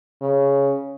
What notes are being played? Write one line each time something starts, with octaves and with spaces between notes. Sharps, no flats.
C#3